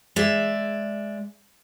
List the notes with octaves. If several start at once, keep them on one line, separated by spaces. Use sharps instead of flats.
G#3 D5 E5